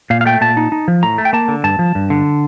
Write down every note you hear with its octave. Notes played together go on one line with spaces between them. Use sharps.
A#2 F5
F5
A3 G5
A#2 A5
D#4
D#4
F3
A2 A#5
A3
G5
A#3 A5
D3
G2 A5
F3
G2
D3